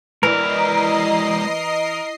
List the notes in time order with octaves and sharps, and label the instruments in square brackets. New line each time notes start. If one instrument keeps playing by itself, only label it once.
[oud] E3 [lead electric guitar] G#3 D5 [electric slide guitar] A#4 [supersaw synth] D#5 C7